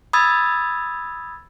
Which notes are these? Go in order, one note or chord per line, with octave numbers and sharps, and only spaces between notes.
B5 D#6 E6 G#6 A6